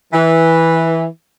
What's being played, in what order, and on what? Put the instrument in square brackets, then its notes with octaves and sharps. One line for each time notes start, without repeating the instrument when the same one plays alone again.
[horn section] E3